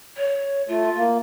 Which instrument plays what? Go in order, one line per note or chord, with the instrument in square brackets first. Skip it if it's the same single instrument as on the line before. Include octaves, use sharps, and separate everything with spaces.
[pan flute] C#5
[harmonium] A3 [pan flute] F4
[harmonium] A#3